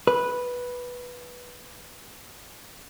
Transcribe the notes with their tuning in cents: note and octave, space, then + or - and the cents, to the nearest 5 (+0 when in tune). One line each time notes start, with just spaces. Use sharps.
B4 -5